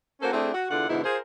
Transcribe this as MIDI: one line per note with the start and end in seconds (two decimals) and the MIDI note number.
0.21 0.29 58
0.21 0.29 61
0.21 0.29 66
0.21 0.29 69
0.21 0.29 70
0.21 0.29 72
0.33 0.53 57
0.33 0.53 60
0.33 0.53 62
0.33 0.53 64
0.33 0.53 68
0.53 0.69 66
0.70 0.88 40
0.70 0.88 50
0.70 0.88 64
0.70 0.88 65
0.70 0.88 74
0.70 0.88 78
0.88 1.01 44
0.88 1.01 47
0.88 1.01 50
0.88 1.01 63
0.88 1.01 64
1.03 1.18 65
1.03 1.18 68
1.03 1.18 70
1.03 1.18 72